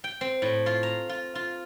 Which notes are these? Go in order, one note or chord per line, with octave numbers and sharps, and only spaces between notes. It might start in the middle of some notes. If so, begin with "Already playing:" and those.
G5
C4
A2
F4
A#5
F4
F4